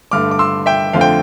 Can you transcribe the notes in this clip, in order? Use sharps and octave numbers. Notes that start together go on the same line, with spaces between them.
G2 D3 A3 D6 F6
D6
C6 E6
E5 G5
F2 D3 A3 C4 F5
G5